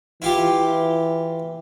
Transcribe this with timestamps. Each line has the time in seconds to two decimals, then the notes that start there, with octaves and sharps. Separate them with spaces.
0.22 E3 E4 F4 G4